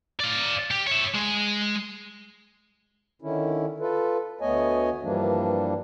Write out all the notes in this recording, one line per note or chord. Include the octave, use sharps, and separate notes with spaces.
D5 F5
G4
C#5 E5
G#3
D3 D#3 C#4 E4
F4 A4 B4
D2 A3 B3 C#5 D#5 G#5
G2 E3 F3 G3 A#3 D4